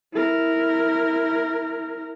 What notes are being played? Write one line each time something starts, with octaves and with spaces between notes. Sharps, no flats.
E4 A#4